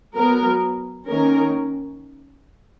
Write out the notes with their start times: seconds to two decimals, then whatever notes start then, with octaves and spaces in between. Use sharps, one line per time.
0.15 F#3 B3 A#4
1.09 D#3 A#3 C#4 A#4